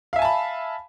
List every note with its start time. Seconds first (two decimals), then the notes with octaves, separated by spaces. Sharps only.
0.13 F5
0.16 E5
0.19 G#5
0.22 A5
0.25 B5